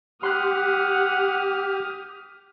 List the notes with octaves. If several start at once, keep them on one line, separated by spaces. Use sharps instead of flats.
G4 F#5 C6 D#6 F6 F#6